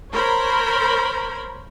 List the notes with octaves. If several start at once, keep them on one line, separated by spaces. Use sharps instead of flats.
A#4 C5 C#5 B5